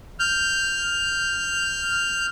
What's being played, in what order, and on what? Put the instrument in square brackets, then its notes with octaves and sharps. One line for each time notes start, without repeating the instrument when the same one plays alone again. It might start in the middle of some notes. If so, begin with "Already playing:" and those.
[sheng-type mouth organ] F6 G6